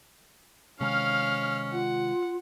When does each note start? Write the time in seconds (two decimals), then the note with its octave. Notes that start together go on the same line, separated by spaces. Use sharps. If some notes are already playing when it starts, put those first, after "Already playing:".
0.81 C3 D#3 G#3 C#4 F5 F6
1.72 F4 F#5